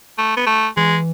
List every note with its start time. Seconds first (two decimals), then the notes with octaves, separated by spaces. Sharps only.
0.18 A3
0.37 B3
0.46 A3
0.77 E3 G#3